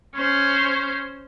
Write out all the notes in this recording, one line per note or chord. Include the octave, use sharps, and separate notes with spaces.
C#4 C5